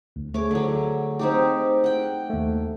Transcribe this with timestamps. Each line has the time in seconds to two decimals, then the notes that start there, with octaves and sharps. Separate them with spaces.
0.16 D2
0.34 A3 G#4 C#5 D6
0.51 D3 F#3
1.19 C4 D#4 G4
1.84 F#5 G5
2.30 D#2 A3